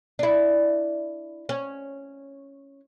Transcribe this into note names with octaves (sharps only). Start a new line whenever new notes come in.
D4 E4
C#4